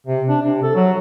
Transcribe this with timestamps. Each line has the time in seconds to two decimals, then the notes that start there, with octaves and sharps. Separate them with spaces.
0.07 C3
0.29 D4
0.42 C3
0.63 A4
0.75 F#3